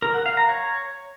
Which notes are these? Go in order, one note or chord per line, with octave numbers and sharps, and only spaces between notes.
A#4
F#5
F5
A#5
C#5